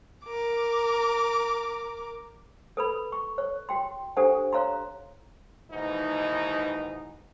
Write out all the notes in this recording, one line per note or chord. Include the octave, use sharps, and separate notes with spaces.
A#4 D6
A4 B4 B5
C#6
C#5
F#4 G5 C6
D4 G4 A4 C5 F#5 G#5
C#5 F5 A#5 C6
D#2 G#2 B2 E3 D#4